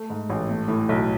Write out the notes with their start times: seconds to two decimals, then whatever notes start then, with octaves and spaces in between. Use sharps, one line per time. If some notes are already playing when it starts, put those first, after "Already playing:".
Already playing: A3
0.10 G#2
0.30 A1
0.49 A3
0.68 A2
0.89 B1